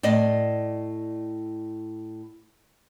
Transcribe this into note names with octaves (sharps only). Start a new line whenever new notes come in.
A2 D5 D#5